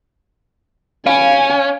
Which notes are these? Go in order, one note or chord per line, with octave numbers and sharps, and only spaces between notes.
C#4 F5 G#5